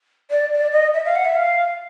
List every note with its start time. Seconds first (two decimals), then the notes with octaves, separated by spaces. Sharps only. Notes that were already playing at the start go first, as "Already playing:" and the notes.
0.31 D5
0.53 D5
0.72 D#5
0.94 E5
1.05 F5
1.16 F#5
1.25 E5
1.35 F5